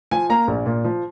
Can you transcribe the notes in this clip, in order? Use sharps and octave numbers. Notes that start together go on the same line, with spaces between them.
F3 G#5
A#3 A#5
A#1
A#2
F3